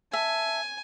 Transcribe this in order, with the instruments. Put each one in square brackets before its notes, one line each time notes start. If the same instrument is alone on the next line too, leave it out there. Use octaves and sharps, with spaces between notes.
[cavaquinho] E5 [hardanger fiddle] G#5 [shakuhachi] A5